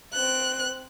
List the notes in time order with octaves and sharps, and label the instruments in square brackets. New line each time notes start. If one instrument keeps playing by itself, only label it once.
[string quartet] C4 F#6